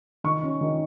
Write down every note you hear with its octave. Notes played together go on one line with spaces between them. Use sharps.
D#3 C#6
C#4
D#3